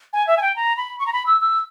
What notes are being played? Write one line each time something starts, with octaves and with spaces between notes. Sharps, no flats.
G#5
E5
G#5
G5
A#5
B5
C#6
A#5
B5
E6
E6